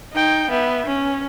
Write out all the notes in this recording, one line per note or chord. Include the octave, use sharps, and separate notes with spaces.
D#4 G5
B3 E5
C#4